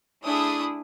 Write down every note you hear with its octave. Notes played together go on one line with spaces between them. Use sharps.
A3 D4 E4 G#4 D#6